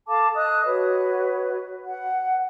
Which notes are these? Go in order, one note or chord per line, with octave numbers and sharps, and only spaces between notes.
A4 F5 A5 D6
D#5 D#6 F#6
F#4 B4 C#5
F#5